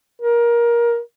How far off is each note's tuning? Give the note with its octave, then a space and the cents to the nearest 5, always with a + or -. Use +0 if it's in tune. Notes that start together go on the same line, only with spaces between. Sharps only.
A#4 +20